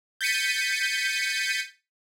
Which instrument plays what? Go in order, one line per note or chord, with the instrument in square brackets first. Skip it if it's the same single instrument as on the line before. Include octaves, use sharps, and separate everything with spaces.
[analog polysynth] G6 A6 B6 C#7 D#7